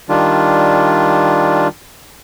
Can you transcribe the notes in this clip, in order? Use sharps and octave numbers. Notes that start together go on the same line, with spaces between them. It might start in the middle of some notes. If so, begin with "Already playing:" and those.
D#3 G3 D4 F4